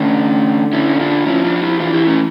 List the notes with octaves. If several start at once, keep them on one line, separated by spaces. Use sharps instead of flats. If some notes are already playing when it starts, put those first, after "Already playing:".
Already playing: D3 A3 C#4
C#4 E4
E4
D4 F4
F3 C#4 E4
D4 F4
E4 G4
E3 D4 F4
E4 G4
A3 C#4